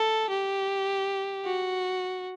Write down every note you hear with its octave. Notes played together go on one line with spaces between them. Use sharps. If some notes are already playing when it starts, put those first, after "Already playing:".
Already playing: A4
G4
F#4